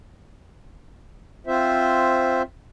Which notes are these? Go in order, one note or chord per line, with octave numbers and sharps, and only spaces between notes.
C4 F4 C5 E5